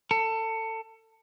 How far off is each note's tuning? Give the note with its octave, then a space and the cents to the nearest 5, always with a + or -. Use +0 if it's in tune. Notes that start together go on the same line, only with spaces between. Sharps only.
A4 +25